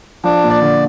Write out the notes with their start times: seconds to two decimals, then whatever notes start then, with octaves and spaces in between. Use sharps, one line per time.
0.24 F3 D4
0.44 A#2
0.50 D5
0.62 D3